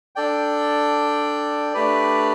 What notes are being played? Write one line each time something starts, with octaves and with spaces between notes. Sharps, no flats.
D4 A4 D5 G5
A3 D4 G4 B4 D5